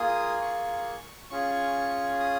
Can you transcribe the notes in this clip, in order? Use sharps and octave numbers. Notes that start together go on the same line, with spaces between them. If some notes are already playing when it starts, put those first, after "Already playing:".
Already playing: A#3 F4 G#4 D#6
C#6
C#4 F4 G#4 C#6
D#6